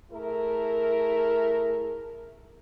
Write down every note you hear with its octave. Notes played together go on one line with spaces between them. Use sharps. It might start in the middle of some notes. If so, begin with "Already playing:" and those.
A3 E4 G#4 A#4